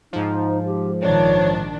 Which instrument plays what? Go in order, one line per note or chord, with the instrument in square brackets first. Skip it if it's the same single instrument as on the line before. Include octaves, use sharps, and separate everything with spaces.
[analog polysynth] G#2 F3 [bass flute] D#4
[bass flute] G4
[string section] A#1 D#3 D4 [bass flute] C#5